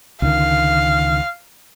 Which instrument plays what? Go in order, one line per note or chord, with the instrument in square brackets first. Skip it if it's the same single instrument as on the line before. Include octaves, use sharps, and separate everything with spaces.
[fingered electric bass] C#2 D3 D#3 [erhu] F5